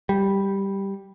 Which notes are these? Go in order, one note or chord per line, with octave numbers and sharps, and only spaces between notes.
G3